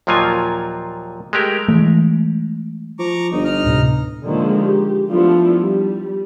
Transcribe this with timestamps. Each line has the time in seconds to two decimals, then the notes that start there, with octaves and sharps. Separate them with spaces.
0.07 D#2 A#2 F3 F#3 F4 G#5
1.33 G#3 A3 G4 A#4
1.68 E3 G#3 A3
2.99 F3 A#5 C#6 D6
3.32 G1 D#4
3.45 D#4 A#5 F6
3.64 D2 A2 C3
4.24 D3 D#3 F3 G#3 A#3
4.59 G4
5.08 F3 A3 B3 D4 E4 F4
5.60 G3